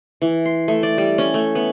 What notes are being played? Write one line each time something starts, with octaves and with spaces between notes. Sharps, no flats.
E3
C6
A3
D5
G3
C#4
A3
B3